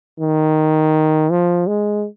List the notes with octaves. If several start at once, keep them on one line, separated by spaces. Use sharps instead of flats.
D#3
F3
G#3